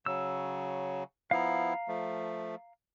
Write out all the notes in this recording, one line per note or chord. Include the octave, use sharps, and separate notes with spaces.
C#3 F#3 E6
F3 B3 E4 F5 A#5
F3 A3